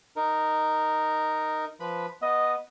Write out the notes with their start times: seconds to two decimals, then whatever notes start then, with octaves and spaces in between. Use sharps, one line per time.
0.16 D#4 A#4
1.80 F3 B4 B5
2.22 B3 D#5